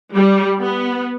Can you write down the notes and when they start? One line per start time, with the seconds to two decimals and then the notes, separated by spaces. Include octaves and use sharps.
0.16 G3
0.59 B3